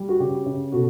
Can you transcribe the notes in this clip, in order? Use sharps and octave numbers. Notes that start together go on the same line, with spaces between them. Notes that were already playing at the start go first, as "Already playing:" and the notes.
Already playing: G3
F#4
C#3 G4
C#3
B2 F#4 A4